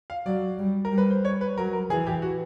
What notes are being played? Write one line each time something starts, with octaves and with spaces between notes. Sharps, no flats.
F5
F#3 D5
G3
A#4
G3
B4
C5
C#5
B4
F#3 A#4
A#4
E3 G#4
G4
F#4